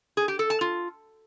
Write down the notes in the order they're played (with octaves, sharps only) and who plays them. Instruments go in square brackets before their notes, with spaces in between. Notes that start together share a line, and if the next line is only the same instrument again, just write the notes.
[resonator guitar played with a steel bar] G#4
G4
A4
A5
F4